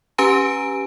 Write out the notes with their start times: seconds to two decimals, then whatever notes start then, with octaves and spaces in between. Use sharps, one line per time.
0.18 C#4 G4 B4 G#5 A#5 D7